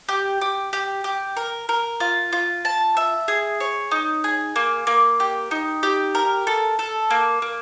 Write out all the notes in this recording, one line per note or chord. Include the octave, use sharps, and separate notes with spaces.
G4
G4
G4
G4
A#4
A#4
F4
F4
A5
E5
G#4
C#5
D#4
G#4
A#3
A#3
G4
D#4
G4
A#4
A4
A4
A#3
A#3